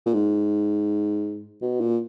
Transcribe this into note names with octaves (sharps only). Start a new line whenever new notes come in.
A#2
G#2
B2
A#2